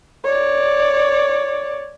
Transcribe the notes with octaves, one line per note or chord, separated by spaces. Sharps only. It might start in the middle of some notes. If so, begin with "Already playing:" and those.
C#5 D5